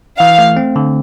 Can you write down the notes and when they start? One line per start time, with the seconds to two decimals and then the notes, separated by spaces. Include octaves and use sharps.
0.19 E3 F5
0.39 A3
0.57 C4
0.76 D3